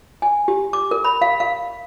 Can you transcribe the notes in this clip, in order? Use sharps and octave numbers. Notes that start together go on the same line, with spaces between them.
G#5
G4
D6
A#4
B5
F5
F5